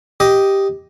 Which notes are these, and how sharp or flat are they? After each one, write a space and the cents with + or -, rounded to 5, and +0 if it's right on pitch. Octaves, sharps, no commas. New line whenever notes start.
G4 +0 D#5 +5